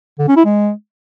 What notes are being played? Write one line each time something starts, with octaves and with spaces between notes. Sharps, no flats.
D3
C#4
E4
G#3